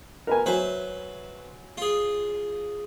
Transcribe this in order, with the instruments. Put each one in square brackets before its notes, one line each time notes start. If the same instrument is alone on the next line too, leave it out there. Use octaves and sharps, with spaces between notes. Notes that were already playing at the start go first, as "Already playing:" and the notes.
[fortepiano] A#4 B4 G#5
[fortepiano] F#3 G#5 [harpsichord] B4 C5 E5
[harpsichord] F4 G#4